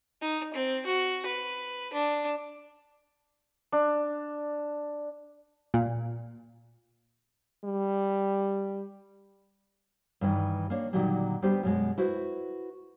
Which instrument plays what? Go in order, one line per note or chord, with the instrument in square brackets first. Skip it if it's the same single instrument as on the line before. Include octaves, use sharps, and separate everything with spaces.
[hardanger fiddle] D#4
C4
F#4
B4
D4
[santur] D4
[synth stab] A#2
[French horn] G3
[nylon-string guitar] G2 D#3 E3
A#3 D4 C#5
A#2 D3 D#3 F#3 G3 A#3
G3 B3 D4 G4 C5
F#2 B2 G#3
E4 F#4 B4 C5